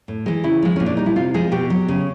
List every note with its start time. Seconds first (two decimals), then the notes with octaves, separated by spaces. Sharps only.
0.08 A2
0.26 E3 G#3
0.44 C#3 E4
0.62 F3 G#3
0.76 A#2 C#4
0.86 D4
0.97 G3 D#4
1.06 E4
1.16 C3 F4
1.34 F3 G#3 G#4
1.52 B2 G4
1.70 F#3
1.88 C#3